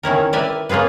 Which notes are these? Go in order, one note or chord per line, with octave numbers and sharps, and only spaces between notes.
D#3 C#4 E4 A#4
A#4 B4 D5 E5 G5 G#5
A#3 C#4 F4 G#4 B4